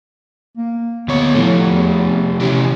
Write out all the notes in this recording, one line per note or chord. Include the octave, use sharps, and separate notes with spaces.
A#3
D2 B3 C#5
A2 F3 A3
E2
C3 E3 C#4